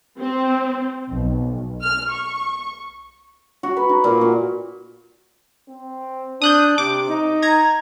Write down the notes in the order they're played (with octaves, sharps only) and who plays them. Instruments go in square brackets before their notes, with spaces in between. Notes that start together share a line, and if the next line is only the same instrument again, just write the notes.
[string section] C4
B1
F6
C#6
[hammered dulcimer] F#4
B4
D#4
A#2
F#4
[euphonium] C4
[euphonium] D4 [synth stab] D#6 F#6 G6
[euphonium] C3 [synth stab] D6
[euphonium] D#4
[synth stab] A#5 G#6